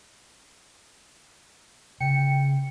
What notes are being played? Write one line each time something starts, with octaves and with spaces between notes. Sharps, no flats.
C#3 G5 C#7